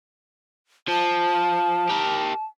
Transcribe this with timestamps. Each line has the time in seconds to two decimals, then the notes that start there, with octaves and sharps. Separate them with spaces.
0.88 F3 A5
1.90 G4 A#4